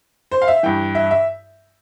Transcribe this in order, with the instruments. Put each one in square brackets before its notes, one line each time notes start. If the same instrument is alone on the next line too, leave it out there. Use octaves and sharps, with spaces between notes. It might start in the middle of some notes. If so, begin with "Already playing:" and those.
[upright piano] C5
F5
E5
G2 E3 G5
E5
E5